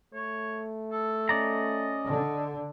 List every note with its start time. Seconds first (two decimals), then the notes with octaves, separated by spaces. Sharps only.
0.14 A3 C#5
0.91 A4
1.29 C#4 D5 D#5 A#5
2.08 D3